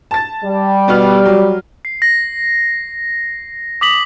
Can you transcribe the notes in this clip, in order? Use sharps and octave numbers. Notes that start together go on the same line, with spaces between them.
A5 A6
G3
B2 B3 F6
F#3
C7
A#6
D6 D#6 B6 F#7